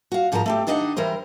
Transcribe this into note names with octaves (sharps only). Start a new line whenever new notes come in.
F#4 F5
G#2 F3 B3 A#4 A5 A#5
A3 C4 G4
D#3 D4 D#4 D#5 F5 F#5
E3 G3 A#4 C5